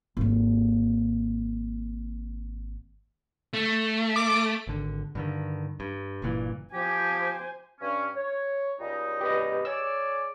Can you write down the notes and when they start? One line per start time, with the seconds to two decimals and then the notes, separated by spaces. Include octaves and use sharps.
0.17 G#1 A#3
3.54 A3
4.16 D6
4.67 G#1 D3
5.15 G2 D3 D#3
5.80 G2
6.22 F#1 G2 A#2 E3
6.73 F3 G4 C5 G#5
7.81 G2 C#4
8.15 C#5
8.79 C#2 G3 D#4
9.21 G4 B4 D#5
9.65 G#4 C#5 D5 E6